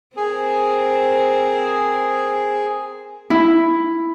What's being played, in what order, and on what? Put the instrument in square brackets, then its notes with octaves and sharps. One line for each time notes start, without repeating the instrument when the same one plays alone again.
[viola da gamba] C4 A#4 C5 [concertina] G#4
[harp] E4